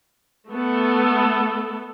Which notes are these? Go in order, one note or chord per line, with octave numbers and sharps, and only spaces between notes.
A3 B3 A4